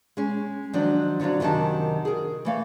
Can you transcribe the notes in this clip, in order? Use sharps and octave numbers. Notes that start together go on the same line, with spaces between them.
G#3 C#4
D#3 F3 F#3 D4
D3 F#3 C4 D4 F4
F#2 C3 D#3 D#5 A5
G#4 A#4
E3 A3 F5